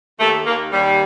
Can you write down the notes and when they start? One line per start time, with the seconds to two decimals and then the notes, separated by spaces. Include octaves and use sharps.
0.20 D#2 A3
0.46 D#2 A#3
0.72 D#2 G3